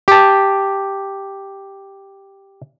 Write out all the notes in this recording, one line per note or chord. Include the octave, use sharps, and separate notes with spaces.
G4 A5